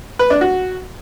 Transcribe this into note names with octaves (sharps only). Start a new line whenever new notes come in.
B4
D4
F#4